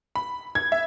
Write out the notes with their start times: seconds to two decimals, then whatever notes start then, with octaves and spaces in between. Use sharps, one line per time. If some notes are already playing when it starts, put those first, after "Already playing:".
0.16 B5
0.55 G#6
0.72 E5